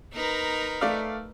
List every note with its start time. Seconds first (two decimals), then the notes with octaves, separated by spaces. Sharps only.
0.13 D#4 A#4 B4
0.81 A3 D5 F5